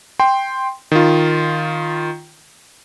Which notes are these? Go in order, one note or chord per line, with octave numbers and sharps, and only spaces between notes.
G5 C6
D#3 F4